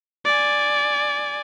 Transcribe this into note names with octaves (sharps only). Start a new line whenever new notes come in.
D5 G#5